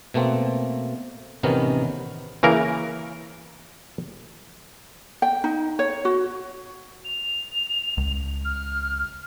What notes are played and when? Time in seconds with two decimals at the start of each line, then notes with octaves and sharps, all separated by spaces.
0.14 B2 A3 A#3 C4
1.43 A1 C3 D#3 B3 C#4 A#4
2.43 C#3 E3 A#3 A#4
5.22 G5
5.44 D#4
5.79 C#5
6.05 F#4
7.05 F7
7.97 C#2
8.45 F6